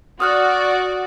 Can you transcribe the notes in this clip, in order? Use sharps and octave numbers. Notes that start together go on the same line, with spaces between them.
F#4 D5 D#6 F6 F#6